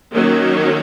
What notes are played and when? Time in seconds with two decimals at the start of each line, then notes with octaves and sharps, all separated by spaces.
0.13 D#3 F#3 A#3 C#4